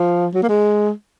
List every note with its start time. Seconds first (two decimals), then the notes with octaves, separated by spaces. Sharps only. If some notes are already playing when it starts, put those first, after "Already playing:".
Already playing: F3
0.34 F#3
0.43 A#3
0.49 G#3